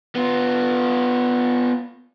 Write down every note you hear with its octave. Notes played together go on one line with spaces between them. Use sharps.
B3 F4